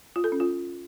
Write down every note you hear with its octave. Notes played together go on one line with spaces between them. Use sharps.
F4
A4
C#4
F4